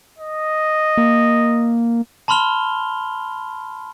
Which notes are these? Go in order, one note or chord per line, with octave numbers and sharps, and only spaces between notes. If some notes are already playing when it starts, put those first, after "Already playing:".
D#5
A#3
A5 B5 C6 F6 F7 G7